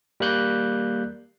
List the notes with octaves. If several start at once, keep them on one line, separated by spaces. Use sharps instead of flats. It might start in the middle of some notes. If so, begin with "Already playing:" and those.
G3 A#3 F#6 G6